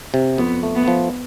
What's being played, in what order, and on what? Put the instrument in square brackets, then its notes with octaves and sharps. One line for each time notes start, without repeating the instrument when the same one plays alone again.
[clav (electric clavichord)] C3
[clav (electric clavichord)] F2 [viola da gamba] B3
[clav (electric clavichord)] A3
[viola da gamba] B3
[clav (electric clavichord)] F3